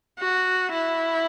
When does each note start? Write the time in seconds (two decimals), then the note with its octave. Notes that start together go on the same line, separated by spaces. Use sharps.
0.19 F#4
0.73 E4